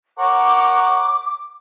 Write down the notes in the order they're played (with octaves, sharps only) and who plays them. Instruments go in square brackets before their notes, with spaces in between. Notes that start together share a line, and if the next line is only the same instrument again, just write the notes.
[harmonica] A#4 C#5 F#5 [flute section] D6